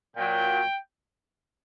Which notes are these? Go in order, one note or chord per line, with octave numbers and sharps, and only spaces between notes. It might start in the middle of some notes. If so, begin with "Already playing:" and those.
A#2 F#3 G5